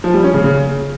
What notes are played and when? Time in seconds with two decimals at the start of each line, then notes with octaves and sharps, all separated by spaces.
0.04 F3
0.14 G3
0.24 C#4
0.34 C#3
0.44 C#3